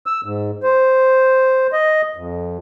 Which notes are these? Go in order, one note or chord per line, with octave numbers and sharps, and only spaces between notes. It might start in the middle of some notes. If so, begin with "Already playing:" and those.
E6
G#2
C5
D#5
F2